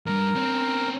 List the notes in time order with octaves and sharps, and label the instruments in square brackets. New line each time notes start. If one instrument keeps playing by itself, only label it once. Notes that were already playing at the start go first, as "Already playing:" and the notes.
[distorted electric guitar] D2 G2 [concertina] A#4
[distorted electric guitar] C4 C#4